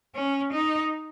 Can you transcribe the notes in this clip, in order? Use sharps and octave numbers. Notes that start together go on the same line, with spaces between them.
C#4
D#4